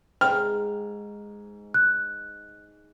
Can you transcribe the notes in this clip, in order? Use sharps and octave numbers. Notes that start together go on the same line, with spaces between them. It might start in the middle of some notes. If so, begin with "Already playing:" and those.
G#2 G5 F6
F#6